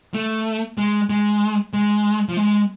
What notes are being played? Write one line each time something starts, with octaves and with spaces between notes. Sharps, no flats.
A3
G#3
G#3
G#3
F3
G#3